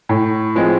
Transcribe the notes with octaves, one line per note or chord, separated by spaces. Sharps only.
A2
F3 G#3 C4